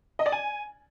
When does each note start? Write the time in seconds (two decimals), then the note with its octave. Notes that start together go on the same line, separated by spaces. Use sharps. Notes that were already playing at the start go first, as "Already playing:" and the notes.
0.19 D#5
0.26 D5
0.32 G#5